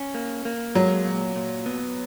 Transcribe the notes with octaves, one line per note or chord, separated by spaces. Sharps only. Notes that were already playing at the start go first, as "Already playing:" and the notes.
Already playing: C#4
A#3
A#3
F#3 G#3
A#2
A#2
B3